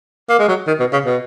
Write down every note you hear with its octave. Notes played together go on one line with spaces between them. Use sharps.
A#3
G#3
F#3
D#3
B2
C#3
B2